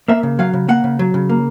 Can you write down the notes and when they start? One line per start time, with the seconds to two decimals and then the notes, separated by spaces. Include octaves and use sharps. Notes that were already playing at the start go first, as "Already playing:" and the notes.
0.08 A#3 E5
0.23 C#3
0.39 F#3 F5
0.53 C#3
0.68 A#3 F#5
0.84 C#3
0.99 F#3
1.14 C#3
1.29 A#3